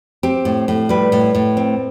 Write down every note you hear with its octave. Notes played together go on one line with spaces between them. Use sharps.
C4 G4
A2
A2
G3 B4
A2
A2
C4